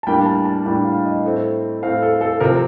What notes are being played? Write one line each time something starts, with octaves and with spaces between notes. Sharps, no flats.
A5
A2 G3 A#3 D4 G5
A5
A5
A2 G3 A#3 D4 G5
F5
D#5
A2 A3 C4
A2 A3 C4 F5
A4
A4
C3 F3 C4 A#4